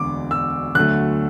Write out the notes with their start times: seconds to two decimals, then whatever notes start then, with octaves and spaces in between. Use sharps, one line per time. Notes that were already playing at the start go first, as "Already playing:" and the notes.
Already playing: E1 D2 D3 D6
0.31 E6
0.75 D2 D3 F#3 A3 F#6